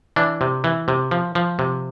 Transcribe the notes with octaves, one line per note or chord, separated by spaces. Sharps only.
E3 D4
C3
E3
C3
F3
F3
C3